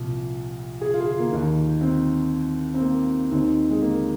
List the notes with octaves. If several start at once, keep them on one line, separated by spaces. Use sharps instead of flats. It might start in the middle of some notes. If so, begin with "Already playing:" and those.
Already playing: C2 A#2 F3
G#4
F4
G#4
F4
A#3
D#2 D#3
C4
C4
A#3
D#2 D#3 C4
G#3
A#3